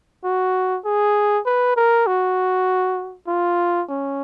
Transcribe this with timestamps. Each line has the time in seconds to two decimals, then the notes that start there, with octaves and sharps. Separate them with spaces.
0.24 F#4
0.85 G#4
1.46 B4
1.77 A#4
2.07 F#4
3.28 F4
3.90 C#4